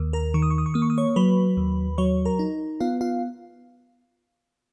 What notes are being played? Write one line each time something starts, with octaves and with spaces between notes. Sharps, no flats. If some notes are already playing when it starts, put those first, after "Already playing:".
Already playing: D#2
A#4 A#5
D#3 C#6
D#6
C#6
D#6
C#6
A#3 D#6
C#6
D#6
C#5 C#6
F#3 B4 B5
D#2
F#3 C#5 C#6
A#4 A#5
D#4
B3 F4 F5
F4 F5